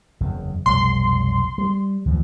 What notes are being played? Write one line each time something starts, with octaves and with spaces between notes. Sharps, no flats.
F#1 E2 C#3
F1 B1 G3 C6
G3
D2 E3 F3